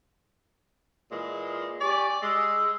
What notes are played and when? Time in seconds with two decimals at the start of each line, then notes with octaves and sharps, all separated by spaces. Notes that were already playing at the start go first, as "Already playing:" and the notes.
1.12 A#2 E3 G#3
1.81 G4 D5 G#5 C#6
2.23 G#3 E6